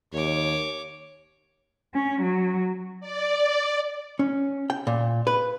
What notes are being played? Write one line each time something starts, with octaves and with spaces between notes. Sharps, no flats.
D#2 C#5 D6
C#4
F#3
D5
C#4
G5
A#2
B4